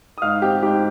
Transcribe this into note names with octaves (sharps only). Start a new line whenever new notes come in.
D#6
G#2 F5 F6
C4 G4 G5
G#2 G4 G5